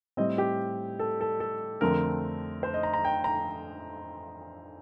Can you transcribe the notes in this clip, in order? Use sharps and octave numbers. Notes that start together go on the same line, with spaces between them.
A2 G3 C4 D#5
G4
A4
A4
A4
F2 D3 A3 C4 A#4
C5
D#5
A#5
A#5
G5
A#5